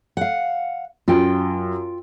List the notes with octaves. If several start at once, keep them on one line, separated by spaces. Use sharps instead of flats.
F5 F#5
F#2 F4 G5